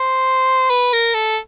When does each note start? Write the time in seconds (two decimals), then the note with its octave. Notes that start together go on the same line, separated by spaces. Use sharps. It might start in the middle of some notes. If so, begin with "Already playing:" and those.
Already playing: C5
0.70 B4
0.93 A#4
1.14 A4